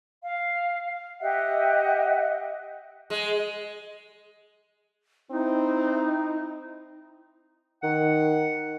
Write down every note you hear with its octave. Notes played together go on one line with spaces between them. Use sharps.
F5
G4 D#5 E5 F#5
G#3
C4 D#4 E4
D#3 F#5